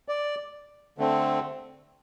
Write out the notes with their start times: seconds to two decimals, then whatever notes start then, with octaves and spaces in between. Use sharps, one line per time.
0.08 D5
0.98 D3 A3 C4